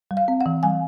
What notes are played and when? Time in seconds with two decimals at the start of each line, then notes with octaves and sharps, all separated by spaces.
0.11 G3
0.17 F5
0.28 C4
0.41 F#5
0.46 E3
0.63 G3 G#5